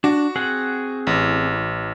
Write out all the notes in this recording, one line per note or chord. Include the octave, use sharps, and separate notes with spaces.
D4 F#4
C4 G#4 F#5
A1